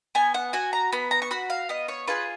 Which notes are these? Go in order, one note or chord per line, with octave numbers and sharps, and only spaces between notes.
B3 G#5
F#5
F#4 G#5
A#5
B3 B5
A#5
C#6
F#4 B5
F5
B3 D#5
C#5
F4 G#4 B4